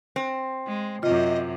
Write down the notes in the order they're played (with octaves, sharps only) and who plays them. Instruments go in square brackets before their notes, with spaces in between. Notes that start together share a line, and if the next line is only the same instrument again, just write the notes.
[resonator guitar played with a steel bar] C4
[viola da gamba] G#3
[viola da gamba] F#2 C3 [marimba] F4 [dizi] D#5